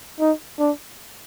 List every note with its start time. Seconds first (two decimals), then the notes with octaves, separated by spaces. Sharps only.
0.20 D#4
0.59 D4